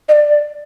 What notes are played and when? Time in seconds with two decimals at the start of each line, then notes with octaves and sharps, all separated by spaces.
0.08 D#5
0.12 D5